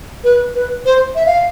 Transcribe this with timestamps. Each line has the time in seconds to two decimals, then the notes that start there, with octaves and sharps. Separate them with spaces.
0.24 B4
0.55 B4
0.85 C5
1.15 E5
1.26 F5